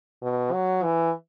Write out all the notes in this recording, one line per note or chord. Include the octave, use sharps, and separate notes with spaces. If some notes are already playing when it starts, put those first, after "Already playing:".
B2
F#3
E3